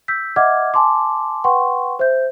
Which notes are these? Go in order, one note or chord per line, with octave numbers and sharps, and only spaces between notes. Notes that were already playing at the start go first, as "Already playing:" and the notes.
E6 G6 B6
D#5 E5 F#5 D6 F6 G#6
G#5 A5 C6 D6
B4 F#5 G5 C6 C#6
C5 E5 G6